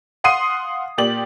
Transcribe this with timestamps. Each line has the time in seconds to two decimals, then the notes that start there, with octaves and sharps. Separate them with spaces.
0.24 F5 F#5 C6 D#6 C7 D#7
0.98 A#2 G4 D5 F#7